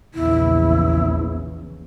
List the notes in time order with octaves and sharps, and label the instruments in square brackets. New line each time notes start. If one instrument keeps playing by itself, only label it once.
[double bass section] A#1 E2 C#3 [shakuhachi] E4